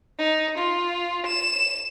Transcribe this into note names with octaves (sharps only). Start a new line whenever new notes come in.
D#4
F4
E7